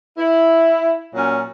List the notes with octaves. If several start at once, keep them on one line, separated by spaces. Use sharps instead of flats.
E4
A#2 F#3 C#4